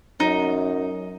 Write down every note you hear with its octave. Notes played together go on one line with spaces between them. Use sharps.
F#2 D#4